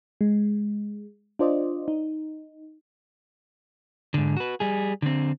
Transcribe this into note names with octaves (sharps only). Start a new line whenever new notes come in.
G#3
D4 F4 C5 D5 D#5
D#4
G#2 D3
F#4 B4
G3 G#4
D3 C4